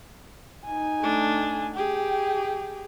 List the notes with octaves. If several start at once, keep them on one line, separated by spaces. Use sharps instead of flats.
D#4 G#5
A3 D4
G4 G#4 G5